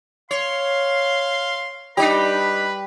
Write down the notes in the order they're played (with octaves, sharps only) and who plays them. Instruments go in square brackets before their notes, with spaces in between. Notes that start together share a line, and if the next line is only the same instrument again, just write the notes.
[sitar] C#5 [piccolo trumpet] F5 [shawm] C6
[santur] G3 [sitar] D4 D#4 G4 [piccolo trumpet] B4 [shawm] B5